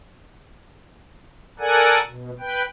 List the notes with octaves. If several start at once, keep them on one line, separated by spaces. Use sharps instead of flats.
A4 A#4 D5 F#5 G#5
B2
B4 G5